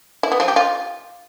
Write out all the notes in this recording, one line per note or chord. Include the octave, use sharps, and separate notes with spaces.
E4
B3
F3
G4
F4